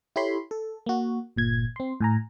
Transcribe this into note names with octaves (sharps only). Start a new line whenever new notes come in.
E4 G4 A4 C#5 B5 C6
A4
A#3 F#4
G1 A#2 G#6
C4 C6
A2 G#5 A#5